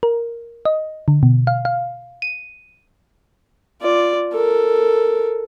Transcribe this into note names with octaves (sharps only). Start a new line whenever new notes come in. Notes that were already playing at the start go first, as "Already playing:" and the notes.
A#4
D#5
D3
B2
F5
F5
D#7
F4 D5
A4 A#4